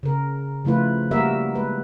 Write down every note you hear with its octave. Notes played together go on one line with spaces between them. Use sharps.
C#3 A#4
C#3 F3 A3 E4 F4 B4
G3 A#3 F#4 A#4 E5
G#3 B4